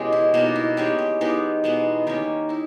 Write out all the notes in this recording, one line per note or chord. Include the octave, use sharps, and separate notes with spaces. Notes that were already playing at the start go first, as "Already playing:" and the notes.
Already playing: B2 E3 G#3 C#4 G4
E4
B2 A#3 D#4 G4
E4
E3 G#3 C#4 G4
G4
E3 G#3 B3 D#4 G4
B2 G#3 B3
D#3 A#3 C#4 G4
D#4 E4